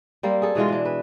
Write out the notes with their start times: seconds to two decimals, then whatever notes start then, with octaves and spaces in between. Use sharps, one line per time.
0.23 G3 A#3 C4
0.42 G#4 A4
0.55 B2 E3 G#3 F4
0.68 E3 D4
0.85 B4